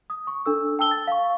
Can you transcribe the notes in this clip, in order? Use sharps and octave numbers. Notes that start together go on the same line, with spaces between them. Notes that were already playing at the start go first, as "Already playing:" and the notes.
D#6
C#6
D4 A4 E6
G5 A5 E6 G7
A6
F5 C#6